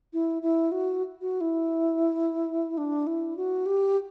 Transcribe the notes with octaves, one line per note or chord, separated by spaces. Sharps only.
E4
E4
F#4
F#4
E4
D4
E4
F#4
G4